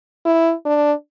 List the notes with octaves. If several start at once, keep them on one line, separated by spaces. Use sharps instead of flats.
E4
D4